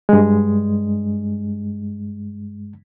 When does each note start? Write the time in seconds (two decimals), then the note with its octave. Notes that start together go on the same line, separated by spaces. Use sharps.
0.09 G2 G#3